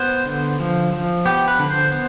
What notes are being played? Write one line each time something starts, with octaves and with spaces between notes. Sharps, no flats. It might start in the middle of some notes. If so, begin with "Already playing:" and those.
Already playing: B3 C5
D3
F3
F3
B3 G4
B4
D3
C5
B3